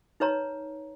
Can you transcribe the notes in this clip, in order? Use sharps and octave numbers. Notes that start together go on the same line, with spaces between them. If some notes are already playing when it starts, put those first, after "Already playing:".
D#4 B4 C#5 A#5